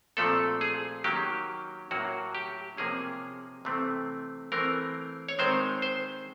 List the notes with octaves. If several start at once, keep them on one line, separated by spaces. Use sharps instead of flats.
A#2 F3 A3 C4 A4
G#4
D#3 F#3 A#3 C#4 G4
A2 F#3 A#3 C#4 F#4
G4
C3 F3 A#3 C#4 G#4
C3 E3 A3 C4
E3 A3 C4 A#4
C#5
D#3 G#3 C4 C5
C5